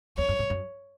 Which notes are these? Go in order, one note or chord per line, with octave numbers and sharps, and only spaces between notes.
E2 C#5
F#2
G#2
F#2